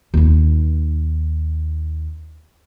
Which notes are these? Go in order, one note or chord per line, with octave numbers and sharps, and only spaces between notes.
D#2 D#4